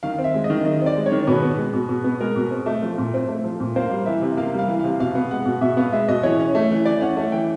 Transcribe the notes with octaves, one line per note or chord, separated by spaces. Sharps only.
D#3 F5
C4
E5
G#3
D#5
D#3
D#3 D#5
C4
D5
G#3
C#5
D#3
B2 B4
B3
G#3
B2
B2
B3
G#3 A#4
B2
C4
A3
F3
A#2
C4
A3
F3
A#2
A#3 C5
G3
E3 E5
C3
A#3 F5
G3
F5
E3
C3 F5
B2 F5
B3
G#3 F#5
B2
B2 E5
B3 F5
G#3 E5
B2 D#5
E3 C#5
C#4
A3
E3
E3 D5
C#4 F#5
A3
E3 G5